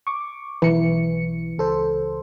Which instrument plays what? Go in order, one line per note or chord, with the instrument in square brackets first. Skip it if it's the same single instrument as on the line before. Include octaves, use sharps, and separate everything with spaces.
[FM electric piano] C#6 D6
[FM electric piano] B1 C#7 [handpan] E3
[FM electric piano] C#2 A4 C5